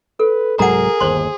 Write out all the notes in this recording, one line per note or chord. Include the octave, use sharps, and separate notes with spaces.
A4 B4
C2 G#2 F#3 G#4 A#4 F#5 A#5
G1 D#2 C5 C6